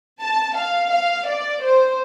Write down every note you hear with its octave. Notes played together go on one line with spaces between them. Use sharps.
A5
F5
F5
D5
C5